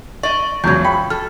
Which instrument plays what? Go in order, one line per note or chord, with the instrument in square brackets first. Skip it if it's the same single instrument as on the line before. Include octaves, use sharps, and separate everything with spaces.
[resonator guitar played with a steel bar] D5 D#5 [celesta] C#6
[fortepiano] E2 F#3 [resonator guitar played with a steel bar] C#3 F3 [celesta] G6 G#6
[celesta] G5 [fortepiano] B5
[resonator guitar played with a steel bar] A4 [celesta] F6